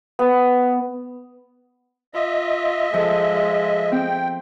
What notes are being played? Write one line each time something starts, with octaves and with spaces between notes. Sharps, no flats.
B3
F4 D#5 E5
F3 G#3 A4
C4 G5